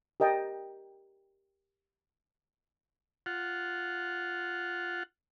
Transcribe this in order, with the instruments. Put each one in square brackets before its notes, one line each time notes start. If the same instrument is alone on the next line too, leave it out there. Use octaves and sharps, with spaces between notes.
[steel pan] G4 A#4 D#5 G5 A5
[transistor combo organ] F4 F#5